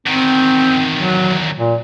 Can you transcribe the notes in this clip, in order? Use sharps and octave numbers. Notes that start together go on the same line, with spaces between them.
E2 D#3 C4
F#3
A#2